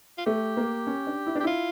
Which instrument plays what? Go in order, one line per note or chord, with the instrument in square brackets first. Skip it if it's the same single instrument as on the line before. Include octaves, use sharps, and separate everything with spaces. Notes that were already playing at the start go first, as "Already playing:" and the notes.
[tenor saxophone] F4
[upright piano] A3 [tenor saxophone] G4
[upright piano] A#3
C#4
D4
E4
D4
[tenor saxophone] G4
[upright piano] E4 [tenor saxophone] F4